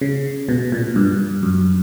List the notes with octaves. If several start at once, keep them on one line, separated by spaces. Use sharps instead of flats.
C#3
B2
A#2
G2
F#2